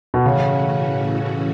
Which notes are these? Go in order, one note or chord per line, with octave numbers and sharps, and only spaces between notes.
B2
A2 C#3 E3 A3 C#4 F#4